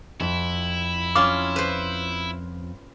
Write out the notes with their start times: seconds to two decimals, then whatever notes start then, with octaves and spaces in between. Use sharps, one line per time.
0.21 F2 E4
1.16 C#4 F4 D6
1.56 B4 C5